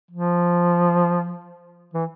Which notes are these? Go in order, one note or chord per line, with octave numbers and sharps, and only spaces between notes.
F3
E3